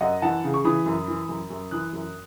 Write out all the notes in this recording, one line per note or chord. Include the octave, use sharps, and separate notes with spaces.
F#2 D#5 F#5
E3 F#5 A5
C#3
C#6
E3 B5 D#6
F#2
E3
F#2
F#2
E3 D#6 F#6
F#2